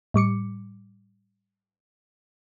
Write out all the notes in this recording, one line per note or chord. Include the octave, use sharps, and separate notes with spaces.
A2 G3 D6 C#7